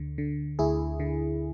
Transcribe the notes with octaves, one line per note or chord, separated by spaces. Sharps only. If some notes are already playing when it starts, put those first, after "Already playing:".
Already playing: D2 D3
D3
D2 E4 G#4
D3